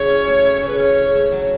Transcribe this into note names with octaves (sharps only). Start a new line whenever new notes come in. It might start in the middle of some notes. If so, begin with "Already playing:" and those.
Already playing: C#3 E4 F#4 C#5
C#4
A3
E4
C#3
B4
C#4 C#5
C#3
A3
F#3